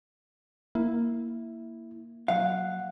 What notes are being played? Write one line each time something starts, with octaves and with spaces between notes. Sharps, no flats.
A#3 E4
F#3 F5 F#5